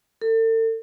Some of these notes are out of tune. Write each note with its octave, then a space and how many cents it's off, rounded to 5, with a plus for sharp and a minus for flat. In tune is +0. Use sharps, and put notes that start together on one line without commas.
A4 +40